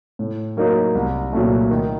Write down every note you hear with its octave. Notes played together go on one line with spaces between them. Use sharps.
A2
F#3 A#3 D#4
C2
A#2 F#3 A3
D#3